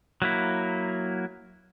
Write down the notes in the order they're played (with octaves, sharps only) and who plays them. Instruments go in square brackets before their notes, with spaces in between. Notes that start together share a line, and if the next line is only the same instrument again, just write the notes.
[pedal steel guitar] F#3 A#3 E4